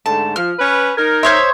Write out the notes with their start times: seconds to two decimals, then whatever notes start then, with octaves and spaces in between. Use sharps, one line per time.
0.06 G#2 D3 A3 A5
0.36 F3 F6
0.58 C#4 B4
0.97 D#4 A#4 G#6
1.23 C5 C#5 E5 C6 D#6 G#6